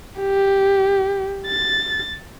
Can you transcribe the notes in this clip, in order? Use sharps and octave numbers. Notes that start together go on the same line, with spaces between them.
G4
A6